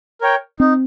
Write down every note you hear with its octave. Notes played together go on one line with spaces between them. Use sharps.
A#4 C#5 G5
C4 D#4